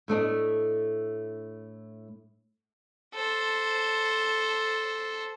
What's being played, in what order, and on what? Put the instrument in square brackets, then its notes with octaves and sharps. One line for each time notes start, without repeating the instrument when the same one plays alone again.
[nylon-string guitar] A2 A3 D4 D#5
[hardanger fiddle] A4 C5